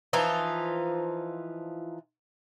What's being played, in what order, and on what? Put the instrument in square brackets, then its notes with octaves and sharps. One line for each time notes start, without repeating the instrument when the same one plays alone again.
[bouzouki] E3 F3 D#4 F4